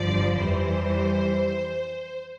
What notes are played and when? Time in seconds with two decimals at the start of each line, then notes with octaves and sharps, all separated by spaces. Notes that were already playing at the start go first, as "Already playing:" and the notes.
Already playing: G1 G2 F3 D5
0.36 F2 E3 G3 C5